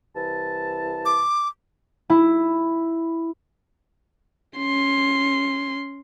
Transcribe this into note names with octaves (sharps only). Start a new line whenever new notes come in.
C2 E3 A5
D6
E4
C#4 C6